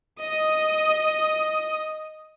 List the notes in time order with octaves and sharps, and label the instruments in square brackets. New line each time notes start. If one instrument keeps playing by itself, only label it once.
[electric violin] D#5 D#6